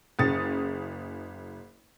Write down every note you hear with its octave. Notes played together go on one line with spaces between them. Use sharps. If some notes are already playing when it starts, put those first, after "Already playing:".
F#1 C#3 G#4 D#6 A6 C#7